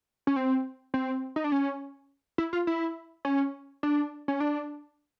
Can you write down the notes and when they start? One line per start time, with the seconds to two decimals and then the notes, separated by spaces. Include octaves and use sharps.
0.27 C#4
0.36 C4
0.94 C4
1.36 D#4
1.44 D4
1.52 C#4
2.38 E4
2.53 F4
2.67 E4
3.25 C#4
3.83 D4
4.28 C#4
4.40 D4